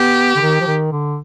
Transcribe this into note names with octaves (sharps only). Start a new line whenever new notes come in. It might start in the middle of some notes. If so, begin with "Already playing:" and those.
Already playing: B3 G4
D3
D#3
F3
D#3
D3